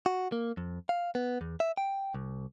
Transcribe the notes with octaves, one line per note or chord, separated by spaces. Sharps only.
F#4
A#3
F2
F5
B3
E2
E5
G5
C2